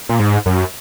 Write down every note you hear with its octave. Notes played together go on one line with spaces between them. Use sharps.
A#2
G#2
F#2